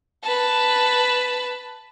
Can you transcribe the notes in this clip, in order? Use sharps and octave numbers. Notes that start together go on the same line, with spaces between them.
B4 A5